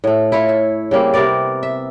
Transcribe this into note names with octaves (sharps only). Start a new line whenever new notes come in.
A2 A3
E4 F4 C#5
E5
C#3 G3 A#3 C4
C3 B3 A#4 D5
E5